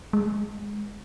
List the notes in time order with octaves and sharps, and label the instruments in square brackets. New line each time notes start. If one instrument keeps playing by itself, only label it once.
[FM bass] G#3